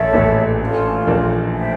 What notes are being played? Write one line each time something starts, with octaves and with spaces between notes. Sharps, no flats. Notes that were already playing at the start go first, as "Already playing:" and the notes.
Already playing: A#1 A#2 A4 C#5 E5
A1 A2
C#4 F4 A4
A#1 A#2
C5 E5 G5